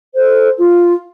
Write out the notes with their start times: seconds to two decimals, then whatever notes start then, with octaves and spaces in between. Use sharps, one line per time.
0.14 A4 C5
0.58 F4